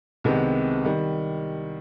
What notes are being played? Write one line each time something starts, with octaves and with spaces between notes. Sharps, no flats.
C2 C3 D#3 G#3 B3
D#3 G3